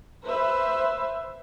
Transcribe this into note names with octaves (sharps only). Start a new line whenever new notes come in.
B4 C5 E5